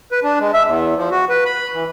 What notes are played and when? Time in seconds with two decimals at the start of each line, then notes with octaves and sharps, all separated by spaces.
0.12 B4
0.23 D4
0.40 G#3
0.54 E5
0.66 E2
0.97 F3
1.11 F#4
1.29 B4
1.46 B5
1.74 E3